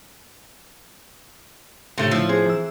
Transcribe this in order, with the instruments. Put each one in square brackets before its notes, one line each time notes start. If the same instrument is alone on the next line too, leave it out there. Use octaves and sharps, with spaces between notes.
[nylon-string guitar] A2 D4 F4 [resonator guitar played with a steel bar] C3 A3
[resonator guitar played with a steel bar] F3 [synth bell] A3 E6
[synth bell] C4 G#4 C5
E3 E6